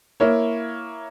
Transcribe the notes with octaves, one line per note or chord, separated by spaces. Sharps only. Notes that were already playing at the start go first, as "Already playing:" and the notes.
A#3 E4 C#5